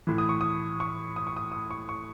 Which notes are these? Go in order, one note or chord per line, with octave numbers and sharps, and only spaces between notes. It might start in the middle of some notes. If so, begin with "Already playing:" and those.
A2 E3
D#6
C#6
D#6
C#6
D#6
C#6
D#6
D#6
C#6
C#6